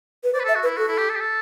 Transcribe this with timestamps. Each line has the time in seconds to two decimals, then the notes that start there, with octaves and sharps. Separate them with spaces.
0.24 B4
0.33 C5 D5
0.40 B4
0.44 A4 E5
0.55 F#4
0.63 B4
0.66 E4
0.77 F#4 A4
0.88 E4
0.98 G4
1.09 A4
1.16 G4
1.20 A4